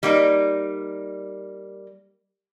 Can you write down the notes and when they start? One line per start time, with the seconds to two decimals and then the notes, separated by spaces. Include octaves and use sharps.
0.03 G3 A#3 D#4